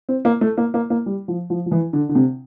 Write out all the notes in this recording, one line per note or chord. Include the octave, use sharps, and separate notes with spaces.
C4
A#3
A3
A#3
A#3
A#3
G3
F3
F3
F3
E3
D3
D3
C3